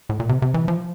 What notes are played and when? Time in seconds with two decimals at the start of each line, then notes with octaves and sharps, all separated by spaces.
0.09 A2
0.20 A#2
0.29 C3
0.42 C3
0.54 E3
0.68 F3